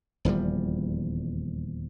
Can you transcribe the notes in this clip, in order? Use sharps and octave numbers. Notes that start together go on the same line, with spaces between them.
D#1 E2 F3 G3